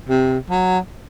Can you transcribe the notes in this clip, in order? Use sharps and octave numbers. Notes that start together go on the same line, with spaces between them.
C3
F#3